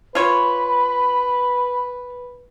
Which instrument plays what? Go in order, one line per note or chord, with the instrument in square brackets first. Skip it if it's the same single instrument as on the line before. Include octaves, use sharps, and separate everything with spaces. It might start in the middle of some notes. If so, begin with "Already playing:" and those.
[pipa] F4 C#5 [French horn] B4 [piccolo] B5